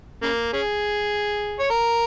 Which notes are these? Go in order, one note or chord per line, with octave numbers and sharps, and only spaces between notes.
C#3 A#3
C#4 G#4
C#5
A#4